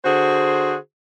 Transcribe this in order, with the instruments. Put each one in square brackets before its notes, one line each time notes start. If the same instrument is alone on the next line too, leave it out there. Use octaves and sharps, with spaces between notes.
[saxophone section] D3 F#4 G#4 C5